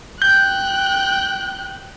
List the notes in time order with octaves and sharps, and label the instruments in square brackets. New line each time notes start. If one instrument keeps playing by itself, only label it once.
[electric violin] G5 F#6 [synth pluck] G6